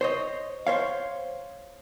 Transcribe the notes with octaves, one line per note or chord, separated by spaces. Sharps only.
C5 C#5 D#5
C5 C#5 F5